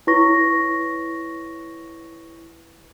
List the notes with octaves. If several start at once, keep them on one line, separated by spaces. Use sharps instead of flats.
E4 B4 C#5 C#6 A#6